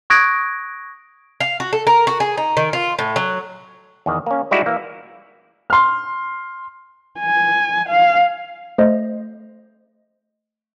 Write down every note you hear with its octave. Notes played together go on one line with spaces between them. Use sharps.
C#6 D#6 F#6 G#6 A#6 D7
F5
F#4
A4
A#4
F#4
G#4
D#4
D#3
F4
A2
F#3
E2 D#3
A#3 C#4
G3 G#3 D#4 E4 F#4 D5
E3 A#3
C6 F6
G#5
F5
A3 C5 D#5